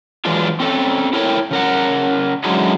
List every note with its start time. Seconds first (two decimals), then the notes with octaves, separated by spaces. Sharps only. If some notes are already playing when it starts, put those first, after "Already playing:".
0.25 E3 F#3 G#3 D4 F4
0.60 C4 C#4 A4
1.13 E4 A4 A#4 C#5 G5
1.51 C#3 A#4 F#5
2.44 D3 F#3 G#3 C#4 D#4 E4